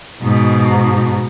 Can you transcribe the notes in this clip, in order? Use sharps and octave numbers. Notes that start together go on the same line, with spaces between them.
G#2 B2